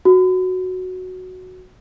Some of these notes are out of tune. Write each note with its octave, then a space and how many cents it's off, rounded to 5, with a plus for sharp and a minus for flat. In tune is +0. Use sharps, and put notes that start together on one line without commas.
F#4 -5